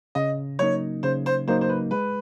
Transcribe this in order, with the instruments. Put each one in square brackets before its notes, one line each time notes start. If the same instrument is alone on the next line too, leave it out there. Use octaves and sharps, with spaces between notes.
[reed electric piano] C#3 [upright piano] D#5
[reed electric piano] F#3 A#3 D#4 [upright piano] C#5
[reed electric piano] C#3 [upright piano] C5
[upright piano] C5
[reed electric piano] F#3 A#3 D#4 [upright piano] C5
[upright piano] C5
B4
[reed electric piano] G#3 [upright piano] B4